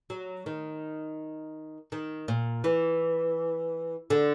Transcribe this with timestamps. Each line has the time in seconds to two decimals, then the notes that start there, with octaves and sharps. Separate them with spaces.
0.10 F#3
0.46 D#3
1.92 D#3
2.28 A#2
2.64 E3
4.10 D3